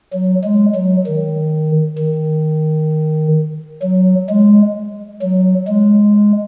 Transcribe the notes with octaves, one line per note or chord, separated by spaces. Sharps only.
F#3
G#3
F#3
D#3
D#3
F#3
G#3
F#3
G#3